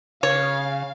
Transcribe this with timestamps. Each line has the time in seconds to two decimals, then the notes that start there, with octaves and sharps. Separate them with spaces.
0.23 C#3 C#5 F5